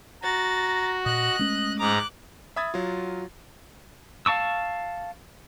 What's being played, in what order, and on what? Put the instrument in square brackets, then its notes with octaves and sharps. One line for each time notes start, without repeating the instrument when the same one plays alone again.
[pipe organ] F#4 [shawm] A#5 [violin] A6
[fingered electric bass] A#2 [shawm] D#5 [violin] F#6
[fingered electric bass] G#3 A3 C#4
[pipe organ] G#2 A#5 [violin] D6 F#6
[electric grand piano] E5 B5 D#6 G#6 A6
F#3 F4
[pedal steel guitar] F5 A5 C#6 E6